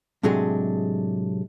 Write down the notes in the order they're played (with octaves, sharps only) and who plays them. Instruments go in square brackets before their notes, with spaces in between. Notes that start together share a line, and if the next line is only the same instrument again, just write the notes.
[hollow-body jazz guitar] A2 C3 F#3 G#3 D4 G#4